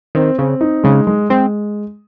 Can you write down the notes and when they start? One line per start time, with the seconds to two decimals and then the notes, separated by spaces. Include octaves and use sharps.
0.15 D#3 C4
0.38 C#3 C4
0.61 D#4
0.84 C#3 G#3
1.07 G#3
1.30 G#3 C4